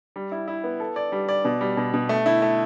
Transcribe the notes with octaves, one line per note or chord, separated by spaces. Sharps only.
G3
E4
E4
B3
A4
D5
G3
D5
B2
G3
B2
B2
A3
E4
A3